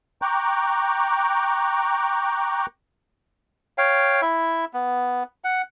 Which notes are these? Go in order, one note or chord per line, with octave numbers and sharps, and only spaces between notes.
G5 A#5 C#6 D6 F#6 G6
C#5 F5 G5
E4 E5
B3
F#5